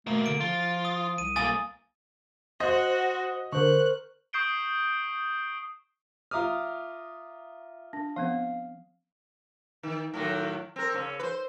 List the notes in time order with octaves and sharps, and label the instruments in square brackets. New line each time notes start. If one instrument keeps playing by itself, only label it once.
[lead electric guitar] B2 A#3 [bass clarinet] A3
[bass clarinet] D3 [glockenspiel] D7
[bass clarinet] F3 [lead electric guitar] F4
[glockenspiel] D#6
[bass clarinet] C2 [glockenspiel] D#7
[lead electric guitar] B1 A#3 [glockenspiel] G#5 D#6 A6
[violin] F#4 [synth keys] C5 F#5 [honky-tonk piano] D#5
[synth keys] D3 [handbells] A#4 C5 C#6 [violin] F#6
[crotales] C#6 D#6 G6 C7 D7 G7
[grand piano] F4 A#5 D#6 [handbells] E5 D6 F6
[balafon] D4
[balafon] F3 B3 C4 [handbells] F5
[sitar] D#3
A2 D#3 F#3
C4 A#4
C#3 C#4
B4 C5